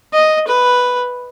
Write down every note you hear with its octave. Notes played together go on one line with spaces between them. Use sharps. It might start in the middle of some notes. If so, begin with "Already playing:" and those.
D#5
B4